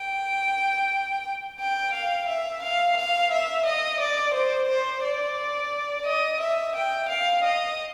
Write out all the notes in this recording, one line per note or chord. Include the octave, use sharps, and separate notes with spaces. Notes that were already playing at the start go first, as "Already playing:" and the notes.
Already playing: G5
G5
F5
E5
F5
F5
E5
D#5
D5
C5
C5
D5
D#5
E5
G5
F5
D#5